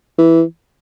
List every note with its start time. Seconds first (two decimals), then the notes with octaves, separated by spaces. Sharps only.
0.18 E3